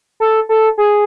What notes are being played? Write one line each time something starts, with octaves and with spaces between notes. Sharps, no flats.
A4
A4
G#4